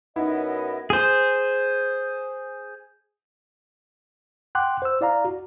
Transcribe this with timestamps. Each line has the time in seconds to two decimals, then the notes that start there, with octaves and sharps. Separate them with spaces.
0.16 F#2 B3 D#4 E4 D#5
0.90 G#4 C5
4.55 F#5 G5 C6 D6 F#6
4.82 C5 E6
5.01 E4 D5 F5 A#5
5.25 F#4